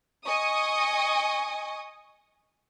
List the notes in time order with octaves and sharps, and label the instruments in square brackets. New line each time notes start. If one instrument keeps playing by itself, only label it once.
[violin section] D#5 G#5 C#6 D#6